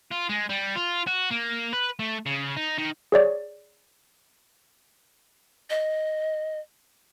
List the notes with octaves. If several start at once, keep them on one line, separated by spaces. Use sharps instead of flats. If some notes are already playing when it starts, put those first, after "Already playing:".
F4
G#3
G3
F4
F#4
A#3
B4
A3
C#3
D#4
D#3
G#4 C#5 D5
D#5